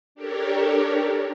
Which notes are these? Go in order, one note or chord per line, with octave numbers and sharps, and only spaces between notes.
D4 G4 A4 A#4 C#5